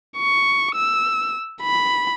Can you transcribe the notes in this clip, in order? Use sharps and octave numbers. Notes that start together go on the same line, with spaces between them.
C#6
E6
B5